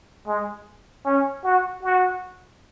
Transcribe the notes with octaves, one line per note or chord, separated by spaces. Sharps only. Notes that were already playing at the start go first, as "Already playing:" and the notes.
G#3
C#4
F#4
F#4